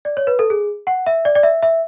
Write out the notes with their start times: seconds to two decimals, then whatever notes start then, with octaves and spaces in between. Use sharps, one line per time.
0.05 D5
0.17 C#5
0.27 B4
0.39 A4
0.50 G#4
0.87 F#5
1.06 E5
1.25 D5
1.35 D5
1.43 E5
1.63 E5